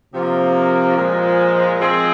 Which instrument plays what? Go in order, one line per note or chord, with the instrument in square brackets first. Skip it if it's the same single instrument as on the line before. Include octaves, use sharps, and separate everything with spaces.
[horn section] C3 F3 A#3
A#2 F3 G#3
F3 G#3 C4 F4 G#4